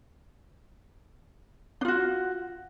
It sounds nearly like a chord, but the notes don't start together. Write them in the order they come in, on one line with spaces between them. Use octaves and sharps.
D4 F4 F#4